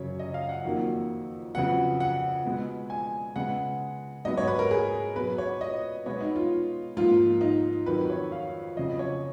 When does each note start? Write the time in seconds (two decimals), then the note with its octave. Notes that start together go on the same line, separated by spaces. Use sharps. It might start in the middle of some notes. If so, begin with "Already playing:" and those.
Already playing: F#2 C#3 F#3 C#5
0.19 D#5
0.34 F5
0.49 F#5
0.65 F2 D#3 F#3 A#3
1.55 F2 C#3 F#3 B3 F#5
2.00 F#5
2.45 B2 G#3 B3
2.90 G#5
3.36 C#3 G#3 B3 F#5
4.25 G#2 F#3 B3 D#5
4.37 C#5
4.48 B4
4.59 A#4
4.71 G#4
5.16 B2 F#3 B3 B4
5.38 C#5
5.61 D#5
6.06 B2 G#3 B3 C#5
6.21 D#4
6.36 F4
6.97 G#2 F3 A#3 F4
7.41 D#4
7.86 F2 D#3 F#3 B4
8.10 C#5
8.32 F5
8.77 F2 C#3 F#3 D#5
8.99 C#5